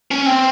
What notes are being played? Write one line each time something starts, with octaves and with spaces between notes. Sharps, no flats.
C#4
C4